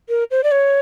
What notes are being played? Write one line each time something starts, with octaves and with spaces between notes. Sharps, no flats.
A#4
C5
D5
C#5